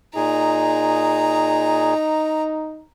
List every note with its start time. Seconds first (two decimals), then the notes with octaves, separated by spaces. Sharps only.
0.16 A#2 D#4 G#4 A#5